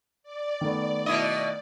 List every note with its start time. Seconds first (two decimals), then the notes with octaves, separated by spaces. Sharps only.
0.23 D5
0.61 D#3 A3 B3
1.06 B2 E4 D#5